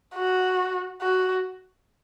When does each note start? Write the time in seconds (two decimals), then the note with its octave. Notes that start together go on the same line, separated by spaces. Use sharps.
0.15 F#4
1.02 F#4